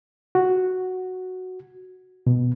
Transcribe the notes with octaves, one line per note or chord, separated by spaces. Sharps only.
F#4
B2